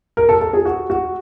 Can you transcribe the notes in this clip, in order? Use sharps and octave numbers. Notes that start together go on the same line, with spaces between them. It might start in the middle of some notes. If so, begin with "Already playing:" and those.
A#4
A4
A4
G#4
F#4
F#4